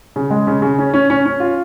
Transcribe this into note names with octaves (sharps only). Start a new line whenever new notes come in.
C#3
G#3
C#3
C#3
C#4
C#4
C#4
C#4
F4